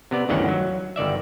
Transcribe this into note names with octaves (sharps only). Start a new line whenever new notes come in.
C3 B3 D5
G1 D2 D#3 E3 C#4 F#5
F#3
G1 D#3 D5 E5